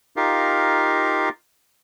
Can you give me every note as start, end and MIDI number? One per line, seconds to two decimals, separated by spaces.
0.16 1.29 63
0.16 1.29 65
0.16 1.29 67
0.16 1.29 70
0.16 1.29 77